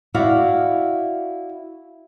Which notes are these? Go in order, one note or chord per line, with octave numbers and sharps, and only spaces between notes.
E4 F#4 D5 F5